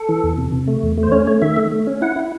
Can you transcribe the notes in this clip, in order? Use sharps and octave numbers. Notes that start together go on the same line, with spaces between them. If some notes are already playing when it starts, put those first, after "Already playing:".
Already playing: A4
E3
E2
C3
C3
A3
E2
A3
C5
C#4 C#5
A3 C#5
D#3 E5
A3
A3
C#4
E4 F#5
E4